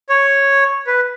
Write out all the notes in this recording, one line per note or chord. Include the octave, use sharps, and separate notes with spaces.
C#5
B4